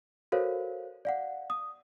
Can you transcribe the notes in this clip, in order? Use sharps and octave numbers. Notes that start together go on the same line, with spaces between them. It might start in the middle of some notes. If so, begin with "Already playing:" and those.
F#4 A4 A#4 C5 C#5 F5
D5 F5 F#5
D#6